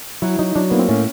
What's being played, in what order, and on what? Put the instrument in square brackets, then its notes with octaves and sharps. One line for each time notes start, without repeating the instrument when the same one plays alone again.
[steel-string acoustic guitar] F#3 [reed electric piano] E4
[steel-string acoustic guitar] F#3 [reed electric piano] D#4
[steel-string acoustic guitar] F#3 [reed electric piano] D4
[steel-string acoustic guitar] A#3 [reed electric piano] B3
[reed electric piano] C4
[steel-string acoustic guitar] A2 [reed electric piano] C#4